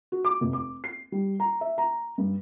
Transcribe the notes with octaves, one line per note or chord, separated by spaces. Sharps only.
F#4
D6
F1
D6
C7
G3
A#5
E5
A#5
G2